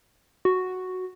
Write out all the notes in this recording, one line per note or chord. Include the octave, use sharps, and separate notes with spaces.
F#4